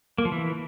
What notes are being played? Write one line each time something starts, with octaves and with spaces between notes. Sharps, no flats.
A#3
F3
E3